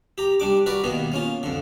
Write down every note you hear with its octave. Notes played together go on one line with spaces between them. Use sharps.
G4 A#5
G3 D4 D6
F#4 A#4 B4 D5 A#5
B2 D#3 A#3 B3
A#3 C#4 F4
F2 D3